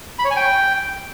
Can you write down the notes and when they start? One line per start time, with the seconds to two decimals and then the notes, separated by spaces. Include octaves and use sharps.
0.19 B5
0.25 C#5
0.30 G#5
0.36 G5